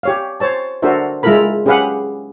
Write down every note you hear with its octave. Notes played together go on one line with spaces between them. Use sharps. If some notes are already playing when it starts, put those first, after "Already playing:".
G4 C#5 F5
C5 C#5 A5
D4 F#4 A4 A#4 C5 E5
G#3 E4 F4 A4 A#4 B5
C#4 G4 G#4 B4 F5 F#5